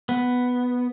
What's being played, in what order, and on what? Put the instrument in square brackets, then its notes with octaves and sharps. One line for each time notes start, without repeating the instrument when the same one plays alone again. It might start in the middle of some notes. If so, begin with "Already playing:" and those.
[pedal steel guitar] B3